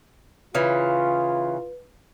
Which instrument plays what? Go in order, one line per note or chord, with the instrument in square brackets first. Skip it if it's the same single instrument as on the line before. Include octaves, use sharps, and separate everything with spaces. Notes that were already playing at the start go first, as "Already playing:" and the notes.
[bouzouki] C#3 E3 [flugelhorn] F4 [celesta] B4